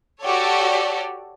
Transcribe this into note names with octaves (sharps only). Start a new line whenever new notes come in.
F#4 G4 A4 C#5 D5